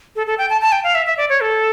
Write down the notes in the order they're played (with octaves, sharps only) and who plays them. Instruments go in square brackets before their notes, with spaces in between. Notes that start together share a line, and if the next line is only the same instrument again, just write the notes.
[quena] A4
A4
G5
A5
A5
G5
F5
E5
E5
D5
C#5
A4